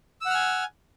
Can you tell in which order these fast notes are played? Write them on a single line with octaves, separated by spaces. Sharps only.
E6 F#5 F6 G#5